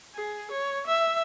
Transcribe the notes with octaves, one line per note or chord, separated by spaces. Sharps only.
G#4
C#5
E5